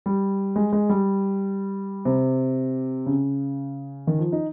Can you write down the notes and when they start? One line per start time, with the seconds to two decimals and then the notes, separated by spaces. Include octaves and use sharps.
0.06 G3
0.56 G#3
0.73 G#3
0.89 G3
2.05 C3
3.06 C#3
4.07 D#3
4.19 F3
4.32 D#4